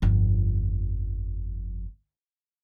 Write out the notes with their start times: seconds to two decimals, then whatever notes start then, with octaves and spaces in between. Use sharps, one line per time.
0.02 G1 F2